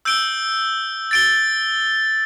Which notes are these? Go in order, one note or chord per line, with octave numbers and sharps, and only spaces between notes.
E6 G6 D7 G7
A6 D7 G7